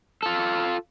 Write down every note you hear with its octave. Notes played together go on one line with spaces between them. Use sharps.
F4 A4